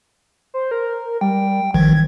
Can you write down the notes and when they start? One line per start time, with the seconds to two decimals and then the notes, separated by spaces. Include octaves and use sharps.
0.54 C5
0.71 A#4
1.21 G3 G5
1.74 A1 D#3 F3 G#6